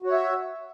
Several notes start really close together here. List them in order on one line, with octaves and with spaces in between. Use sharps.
F#4 C#5 E5